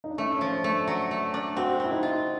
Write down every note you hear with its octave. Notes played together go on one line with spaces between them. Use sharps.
D#4
D4
A3 C#4
C#4
F3
D4
A3
F#3
A3
D4
C4 F#4
C4 E4
D#4
F4